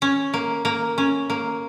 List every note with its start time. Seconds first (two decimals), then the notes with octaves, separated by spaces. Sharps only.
0.02 C#4
0.34 A#3
0.65 A#3
0.98 C#4
1.30 A#3